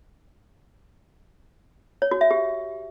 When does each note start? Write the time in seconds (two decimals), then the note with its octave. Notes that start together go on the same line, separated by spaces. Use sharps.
2.02 C#5
2.11 F#4
2.21 E5
2.31 G4